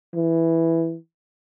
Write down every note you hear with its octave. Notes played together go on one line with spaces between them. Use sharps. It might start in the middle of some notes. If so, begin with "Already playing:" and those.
E3